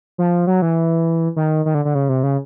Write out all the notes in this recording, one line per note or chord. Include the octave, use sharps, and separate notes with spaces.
F3
F#3
E3
D#3
D#3
D3
D3
C#3
C3
C#3